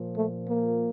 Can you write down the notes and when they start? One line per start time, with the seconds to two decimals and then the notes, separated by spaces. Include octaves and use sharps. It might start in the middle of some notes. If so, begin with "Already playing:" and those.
Already playing: A#2 F3
0.17 A3
0.47 A#3